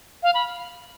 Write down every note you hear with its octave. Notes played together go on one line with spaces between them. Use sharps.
F5
B5